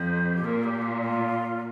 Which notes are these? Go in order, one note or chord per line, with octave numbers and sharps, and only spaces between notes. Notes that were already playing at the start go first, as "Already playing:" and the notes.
Already playing: F2 C5
G4
A#2 A#4
G4
F4
F4